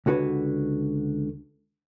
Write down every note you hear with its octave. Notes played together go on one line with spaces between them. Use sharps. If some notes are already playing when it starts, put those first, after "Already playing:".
C#2 D3 F#4 B4 C#5